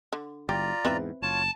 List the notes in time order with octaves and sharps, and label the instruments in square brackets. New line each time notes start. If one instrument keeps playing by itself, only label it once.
[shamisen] D3
[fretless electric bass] F#1 [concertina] F4 D5 A#5 [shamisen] G4
[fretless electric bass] E2 G#2 [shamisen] C4 B4 E5
[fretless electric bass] F#1 [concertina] F4 C#5 [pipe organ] A5